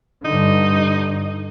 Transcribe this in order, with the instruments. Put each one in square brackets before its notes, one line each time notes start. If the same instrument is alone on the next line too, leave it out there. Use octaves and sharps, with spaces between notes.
[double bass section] G2 D3 [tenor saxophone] D#4